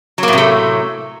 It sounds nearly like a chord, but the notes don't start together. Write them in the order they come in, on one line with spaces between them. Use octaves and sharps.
F#3 A#3 A2 C3 A3